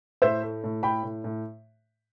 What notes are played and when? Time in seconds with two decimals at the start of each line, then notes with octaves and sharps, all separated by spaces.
0.22 A2 C5 E5
0.43 A3
0.64 A2
0.83 A2 G5 B5
1.03 A2
1.24 A2